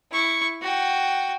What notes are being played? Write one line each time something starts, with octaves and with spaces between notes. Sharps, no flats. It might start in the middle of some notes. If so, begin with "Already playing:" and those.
E4 C#6
F#4 G5